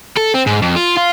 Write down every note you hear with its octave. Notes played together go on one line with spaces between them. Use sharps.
A4
C4
G#2
F2
F4
F4